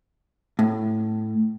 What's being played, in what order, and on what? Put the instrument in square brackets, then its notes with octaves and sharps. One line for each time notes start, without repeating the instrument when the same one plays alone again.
[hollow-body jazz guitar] A2